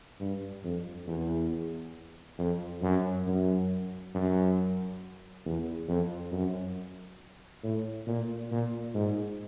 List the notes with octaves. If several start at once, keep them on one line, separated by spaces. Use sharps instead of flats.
G2
F2
E2
F2
F#2
F#2
F#2
E2
F2
F#2
A2
A#2
A#2
G#2